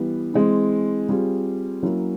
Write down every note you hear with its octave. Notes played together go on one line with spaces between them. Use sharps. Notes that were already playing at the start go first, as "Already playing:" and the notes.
Already playing: E3 G3 B3
E3 G#3 C4
G3 C4 F4 G#4
F#3 A#3 C#4 E4